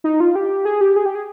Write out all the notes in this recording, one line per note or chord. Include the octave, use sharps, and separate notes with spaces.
D#4
F4
G4
G#4
G4
G#4
G4
G#4